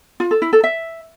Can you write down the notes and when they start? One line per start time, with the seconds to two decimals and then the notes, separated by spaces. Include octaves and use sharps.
0.20 F4
0.31 A4
0.42 E4
0.53 A4
0.64 E5